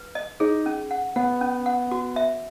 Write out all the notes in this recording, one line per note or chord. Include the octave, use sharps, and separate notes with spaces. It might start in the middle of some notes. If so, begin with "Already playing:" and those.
Already playing: B4
D#5
D#4 G#4
C#4
F#5
B3 F#5
C#4
F#5
F#4
E5